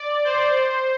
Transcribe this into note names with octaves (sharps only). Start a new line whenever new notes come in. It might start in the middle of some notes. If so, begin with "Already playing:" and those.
Already playing: D5
C5
C5